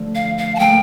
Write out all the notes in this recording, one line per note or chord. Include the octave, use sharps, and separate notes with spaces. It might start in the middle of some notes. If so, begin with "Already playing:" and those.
Already playing: D3 F3 A3
F5
F5
A5
A#2 F3 A3 G5